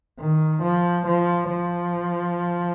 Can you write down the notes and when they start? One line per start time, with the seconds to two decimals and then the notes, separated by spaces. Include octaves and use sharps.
0.20 D#3
0.63 F3
1.06 F3
1.50 F3